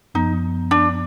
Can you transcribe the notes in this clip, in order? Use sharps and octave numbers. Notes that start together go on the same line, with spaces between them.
F#2 F3 B3 D#4
D4